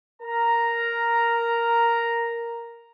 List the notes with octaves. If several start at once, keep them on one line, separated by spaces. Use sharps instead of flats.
A#4 A#5